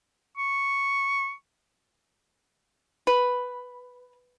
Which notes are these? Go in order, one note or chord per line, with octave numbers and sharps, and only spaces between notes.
C#6
B4